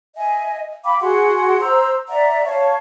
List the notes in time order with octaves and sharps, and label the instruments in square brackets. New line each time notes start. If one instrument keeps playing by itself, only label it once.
[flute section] D#5 E5 G#5
F5 G5 B5 D6
F#4 G#4 F#5 C6
C5 A#5 C6 E6
D5 E5 F#5 A#5
C#5 F5 A5 C#6